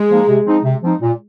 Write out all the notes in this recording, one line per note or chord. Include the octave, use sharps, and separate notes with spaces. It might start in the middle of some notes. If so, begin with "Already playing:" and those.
Already playing: G#3
F3 A#3 D#4
C3
F3 C4 D#4
C3
F3 C4 D#4
A#2